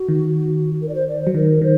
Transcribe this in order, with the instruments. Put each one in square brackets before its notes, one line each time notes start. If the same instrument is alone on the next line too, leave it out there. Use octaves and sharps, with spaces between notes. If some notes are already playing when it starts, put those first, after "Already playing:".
Already playing: [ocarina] F#4
[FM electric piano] D#3
[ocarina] A#4
D5
C5
D5
C5
[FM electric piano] F#3
[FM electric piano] D#3 [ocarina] A#4
[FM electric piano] D#3 [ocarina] C5